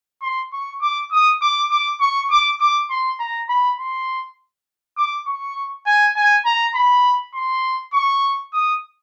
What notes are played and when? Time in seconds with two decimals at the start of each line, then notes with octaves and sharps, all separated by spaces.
0.22 C6
0.53 C#6
0.82 D6
1.12 D#6
1.42 D6
1.71 D6
2.00 C#6
2.31 D6
2.60 D6
2.90 C6
3.19 A#5
3.49 B5
3.79 C6
4.97 D6
5.27 C#6
5.86 G#5
6.16 G#5
6.45 A#5
6.75 B5
7.35 C6
7.94 C#6
8.53 D#6